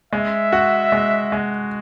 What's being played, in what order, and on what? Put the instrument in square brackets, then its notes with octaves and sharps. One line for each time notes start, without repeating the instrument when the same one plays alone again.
[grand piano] G#3 [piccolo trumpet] E5
[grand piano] F#4
G#3
G#3